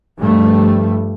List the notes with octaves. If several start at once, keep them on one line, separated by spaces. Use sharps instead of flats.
G2 F3 G3 A3